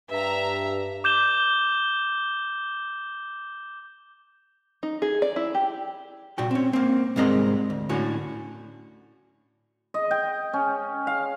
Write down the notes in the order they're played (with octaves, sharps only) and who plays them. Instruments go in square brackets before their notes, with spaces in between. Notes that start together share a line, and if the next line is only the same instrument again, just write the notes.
[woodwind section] G2 [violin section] E5 A#5
[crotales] D6 G6 E7 G7
[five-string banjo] D#4
G#4
D5
E4
G4
[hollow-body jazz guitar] C2 A#2 F#4 G5
C4 C#4
A#3 C4
C2 G#2 G#3 C4 A#4 D#5
D2
A2 D3 C#4 F#4
[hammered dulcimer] D#5
G5
C#4
F5